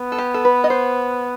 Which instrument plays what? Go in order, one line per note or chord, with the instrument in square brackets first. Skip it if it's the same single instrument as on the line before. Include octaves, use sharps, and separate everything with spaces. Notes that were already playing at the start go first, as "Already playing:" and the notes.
Already playing: [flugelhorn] B3
[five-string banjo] A4
G4
A4
B4
D#5
C5